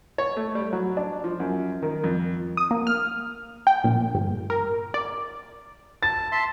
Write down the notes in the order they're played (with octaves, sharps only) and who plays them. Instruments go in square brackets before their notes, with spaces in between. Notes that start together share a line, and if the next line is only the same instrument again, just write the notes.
[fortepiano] C#5
A3
G3
F#3
D4
F3
F#2
D#3
F2
[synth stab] D#6
A#3
F6
G5
A#1
G1
A#4
D5
[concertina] A5 [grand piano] A6
[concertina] E5 A5 C6